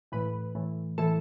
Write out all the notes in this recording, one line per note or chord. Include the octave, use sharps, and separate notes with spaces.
A2 E3 B4
A2 E3
A2 E3 A4